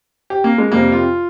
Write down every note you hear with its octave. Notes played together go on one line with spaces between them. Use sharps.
G4
A#3
G#3
F2 C3 G3 A#3
F4